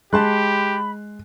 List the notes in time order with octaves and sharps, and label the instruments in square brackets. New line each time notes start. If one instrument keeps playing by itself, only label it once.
[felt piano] G#3 [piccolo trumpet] G4 [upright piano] A5 C6 F#6 [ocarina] B5